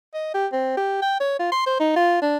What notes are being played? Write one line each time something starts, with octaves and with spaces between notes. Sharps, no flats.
D#5
G4
C4
G4
G5
C#5
F4
C6
C5
D#4
F4
D4